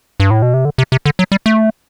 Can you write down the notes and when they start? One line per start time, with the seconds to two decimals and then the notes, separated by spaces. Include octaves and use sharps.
0.20 G2
0.31 A2
0.42 B2
0.54 C3
0.65 D3
0.78 C3
0.92 C3
1.06 D3
1.19 F#3
1.32 G3
1.46 A3